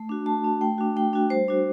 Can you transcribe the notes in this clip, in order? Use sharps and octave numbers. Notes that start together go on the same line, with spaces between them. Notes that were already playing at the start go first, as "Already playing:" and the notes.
Already playing: A3
D4 F#4
A3 A5
D4 F#4
A3 G5
D4 F#4
A3 G5
D4 F#4
G3 C5
D4 F#4